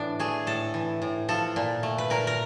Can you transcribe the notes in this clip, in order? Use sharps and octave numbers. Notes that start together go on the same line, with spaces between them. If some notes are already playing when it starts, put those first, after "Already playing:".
Already playing: A2 E3 D4
A3 G#4
A2 A4
E3
A2
F3 A4
A#2
A3
B4
A#2 A#4
A#4